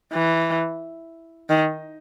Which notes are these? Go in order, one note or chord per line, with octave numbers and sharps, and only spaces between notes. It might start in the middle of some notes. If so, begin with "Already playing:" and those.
E3
D#3